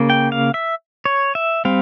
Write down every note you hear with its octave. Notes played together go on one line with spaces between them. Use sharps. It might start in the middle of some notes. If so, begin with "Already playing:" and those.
Already playing: C#3 A#3
G5
F5
E5
C#5
E5
G3 C4 F5